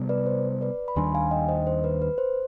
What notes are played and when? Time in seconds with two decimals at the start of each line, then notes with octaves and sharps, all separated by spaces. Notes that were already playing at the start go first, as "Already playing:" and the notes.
Already playing: C3 G3 B3
0.09 B4 D5
0.26 C5
0.61 B4 D5
0.88 B5
0.96 D#2 D#3 G3 D4 G#5 C6
1.14 F5 G#5
1.31 D#5 G5
1.48 C5 D#5
1.67 C5
1.84 B4
2.02 B4
2.18 C5